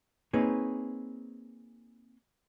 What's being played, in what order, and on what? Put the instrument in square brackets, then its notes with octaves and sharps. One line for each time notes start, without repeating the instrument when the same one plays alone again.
[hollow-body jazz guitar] A#3 C4 D#4 G#4 B4 C#5